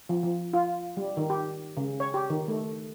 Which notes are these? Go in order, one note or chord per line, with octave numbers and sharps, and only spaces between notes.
F3
F3
F4
G3
D#3
G4
C#3
C#5
G4
D#3
A3